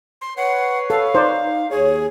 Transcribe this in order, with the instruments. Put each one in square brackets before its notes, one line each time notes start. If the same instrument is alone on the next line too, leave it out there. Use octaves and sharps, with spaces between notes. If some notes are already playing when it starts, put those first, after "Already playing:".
[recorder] C6
[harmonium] B4 C#5 [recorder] F#5 [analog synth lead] C7
[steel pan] A4 [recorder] F5
[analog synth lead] D#4 [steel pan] C5 D5
[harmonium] D#2 [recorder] G#4 [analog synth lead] C#5